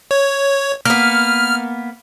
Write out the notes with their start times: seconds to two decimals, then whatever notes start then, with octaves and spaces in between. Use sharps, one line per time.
0.11 C#5
0.85 A#3 B3 F6